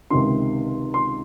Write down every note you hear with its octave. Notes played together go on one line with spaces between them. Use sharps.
C#2 C3 D#3 C6
C6